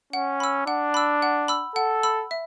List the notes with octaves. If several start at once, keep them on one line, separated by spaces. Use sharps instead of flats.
C#4 F#5
B5 E6
D4 F#5
B5 E6
F#5
B5 E6
A4 F#5
B5 E6
E5